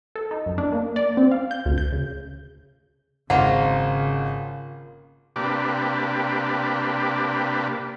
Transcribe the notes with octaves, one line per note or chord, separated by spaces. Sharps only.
A4
D#4
F#2
D4
A#3
D5
C4
F5
G6
D2
G6
C#3
G#1 C#3 A#3 F4 F#5
C3 A#3 D4 G4 B4